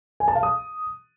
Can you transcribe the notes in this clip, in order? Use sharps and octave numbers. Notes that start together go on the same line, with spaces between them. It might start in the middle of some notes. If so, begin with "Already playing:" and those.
G#5
A5
F5
D#6